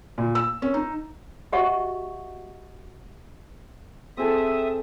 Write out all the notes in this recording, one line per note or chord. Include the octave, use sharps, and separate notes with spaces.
A#2
E6
C#4
D#4
F#4 G4 D#5 E5 F#5 C#6
C4 G#4 A4 E5 D#6